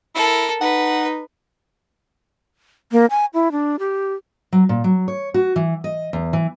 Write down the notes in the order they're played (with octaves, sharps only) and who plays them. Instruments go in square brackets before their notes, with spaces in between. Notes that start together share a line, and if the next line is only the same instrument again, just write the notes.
[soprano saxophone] E4 [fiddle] A4 A#4
[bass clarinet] D#4 [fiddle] B4 [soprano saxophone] F#5
[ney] A#3
G#5
E4
D4
G4
[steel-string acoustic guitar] F#3
A#2
F#3
C#5
F#4
E3
D#5
E2
E3